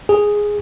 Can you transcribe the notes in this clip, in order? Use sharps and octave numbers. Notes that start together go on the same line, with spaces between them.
G#4